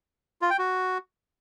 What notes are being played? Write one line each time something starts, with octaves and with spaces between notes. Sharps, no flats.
F4
G5
F#4